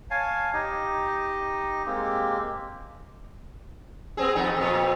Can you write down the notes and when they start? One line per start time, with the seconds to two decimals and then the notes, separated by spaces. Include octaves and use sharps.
0.11 C#5 F5 G#5 A5
0.53 D#4 G4 D#5
1.86 G#3 A#3 C4 G4
4.17 B3 C4 G#4
4.35 F2 B3 D#4
4.57 F2 A#2